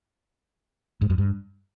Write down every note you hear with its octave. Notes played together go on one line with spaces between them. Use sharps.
G#2
F#2
G2